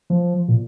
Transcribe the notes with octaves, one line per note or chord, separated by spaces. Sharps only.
F3
A#2